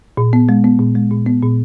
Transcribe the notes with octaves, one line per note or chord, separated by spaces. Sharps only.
A#2
B3
G#3
B3
A#2
G#3
A#2
B3
A#2